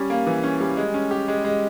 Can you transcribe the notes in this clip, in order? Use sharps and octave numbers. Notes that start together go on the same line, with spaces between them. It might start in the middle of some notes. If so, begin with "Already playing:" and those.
Already playing: G3 C#4
A#3
E3
C#4
G3
G#3
C#4
G4
G#3
G#3